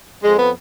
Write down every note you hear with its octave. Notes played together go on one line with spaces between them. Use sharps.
F2 G#3
B3